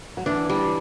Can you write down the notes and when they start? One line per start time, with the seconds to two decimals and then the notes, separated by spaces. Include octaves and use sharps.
0.17 F#3
0.26 E3 D4
0.49 G3